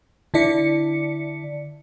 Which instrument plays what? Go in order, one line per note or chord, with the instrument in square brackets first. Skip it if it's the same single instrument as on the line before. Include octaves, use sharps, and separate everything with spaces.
[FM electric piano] D3 E4 D5 C#7